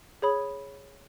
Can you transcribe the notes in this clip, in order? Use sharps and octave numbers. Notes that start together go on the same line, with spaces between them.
G#4 C#5 B5 D#6